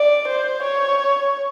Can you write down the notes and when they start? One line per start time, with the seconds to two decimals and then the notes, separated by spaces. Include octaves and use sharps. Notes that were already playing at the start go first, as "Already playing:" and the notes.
Already playing: D5
0.27 C5
0.62 C#5